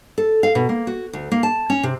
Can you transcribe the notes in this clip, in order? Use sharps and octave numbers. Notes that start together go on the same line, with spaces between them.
A4
F5
B2
A#3
F#4
D2
A#3
A5
C#4
C3